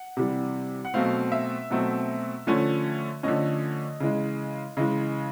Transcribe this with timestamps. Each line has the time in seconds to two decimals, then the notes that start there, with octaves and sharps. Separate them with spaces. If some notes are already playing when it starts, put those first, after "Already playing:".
Already playing: F#5
0.17 C3 E3 G3
0.85 F#5
0.94 B2 F#3 A3 C4 F5
1.32 E5
1.70 B2 F#3 A3 C4
2.47 D3 F3 A3 C#4
3.23 D3 F3 A3 C#4 D#5
4.00 C#3 E3 G#3
4.77 C#3 E3 G#3 D#5